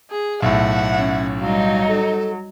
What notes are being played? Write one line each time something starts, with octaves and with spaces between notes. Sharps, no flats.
G#4
B1 A2 E5 F#5
C#4
F#3 G3 D#4 F5
A4